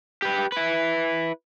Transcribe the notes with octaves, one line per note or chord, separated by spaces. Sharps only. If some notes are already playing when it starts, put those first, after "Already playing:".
G4 B4
E4 B4